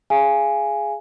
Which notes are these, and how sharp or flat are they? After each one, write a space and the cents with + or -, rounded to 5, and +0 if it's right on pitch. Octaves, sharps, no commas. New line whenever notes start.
G#4 +0 F5 -25 G#5 +0